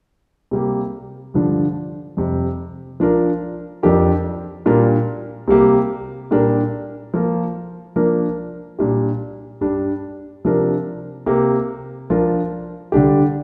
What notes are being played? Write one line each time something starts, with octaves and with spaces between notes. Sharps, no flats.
C3 G3 A#3 G4
G2 D3 F3 D4
F2 C3 G3
F3 D4 F4 A#4
F2 F3 D4 G4 A#4
A#2 G3 D4 F4 A#4
C3 G3 A#3 G4
A#2 G3 D4 G4 A#4
F3 A#3 F4 A#4
F3 A#3 D4 A#4
A#2 G3 D4 G4
G2 G3 D4
C3 F3 D4 A#4
C3 A#3 G4 A#4
F3 D4 F4 A#4
D3 G3 D4 G4